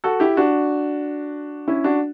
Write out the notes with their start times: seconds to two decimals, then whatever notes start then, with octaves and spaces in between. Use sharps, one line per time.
0.04 F#4 A4
0.20 E4 G4
0.37 D4 F#4
1.68 C#4 E4
1.84 D4 F#4